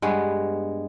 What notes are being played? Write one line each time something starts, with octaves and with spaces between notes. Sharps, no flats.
G2 G#3 B3